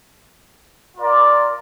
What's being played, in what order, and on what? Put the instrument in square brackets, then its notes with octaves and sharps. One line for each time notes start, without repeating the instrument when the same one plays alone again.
[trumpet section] F4 A#4 D5